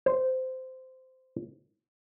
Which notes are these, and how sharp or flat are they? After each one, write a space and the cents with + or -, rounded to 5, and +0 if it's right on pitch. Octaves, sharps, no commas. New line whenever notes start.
C5 -15